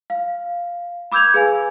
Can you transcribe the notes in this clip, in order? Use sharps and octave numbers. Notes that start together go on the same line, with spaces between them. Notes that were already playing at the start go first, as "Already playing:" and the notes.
F5
B5 D6 E6 G6 G#6 F7
G#4 B4 F5 G#5